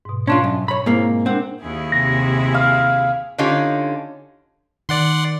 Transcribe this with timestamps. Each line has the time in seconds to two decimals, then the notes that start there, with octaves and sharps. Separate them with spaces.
0.05 G#2 B2
0.28 C#4 D4 F4 A5 C6 G#6
0.44 F#2
0.68 C#5 B5
0.86 G#2 A#3 C4 E4 C5
1.26 C4 D4 A#4 F#5
1.61 D#2 E4 G#4
1.92 C3 A#6
2.54 F5
3.38 D3 C#4 D#4 F4 G4 C#5
4.89 D#3 D5 F#5 C6